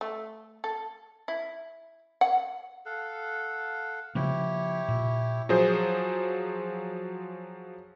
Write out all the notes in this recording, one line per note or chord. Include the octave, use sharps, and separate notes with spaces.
A3
A4
E4
F#5
A4 F5 F#5
C#3 F3 A#3 E4 G4 C#5
A#2
F3 F#3 G#4 C5